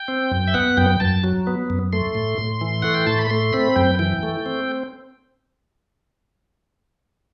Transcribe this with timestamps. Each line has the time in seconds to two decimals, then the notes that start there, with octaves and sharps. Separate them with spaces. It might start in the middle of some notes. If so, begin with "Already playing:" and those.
Already playing: G5
0.08 C4
0.31 F#2
0.48 E5
0.54 B3 F#5
0.77 F#2 G5
1.00 F#2 A5
1.24 F#3
1.47 B3
1.70 F#2
1.93 A3 C6
2.15 A2
2.39 A2
2.61 E3
2.82 A3 F#5
2.94 G5
3.07 A2 A5
3.19 B5
3.30 A3 C6
3.53 C4 B5
3.76 F#2 G5
3.99 E3 G5
4.23 A3
4.46 C4